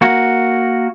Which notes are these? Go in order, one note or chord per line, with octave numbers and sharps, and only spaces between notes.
A#3 F#4